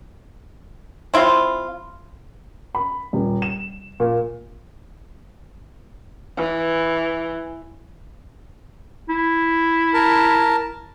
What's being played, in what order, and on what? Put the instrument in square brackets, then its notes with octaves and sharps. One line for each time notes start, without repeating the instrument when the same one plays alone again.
[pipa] C4 E4 F4
[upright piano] B5
D#1
E7
A#2
[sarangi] E3
[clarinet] E4
[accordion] A#4 A5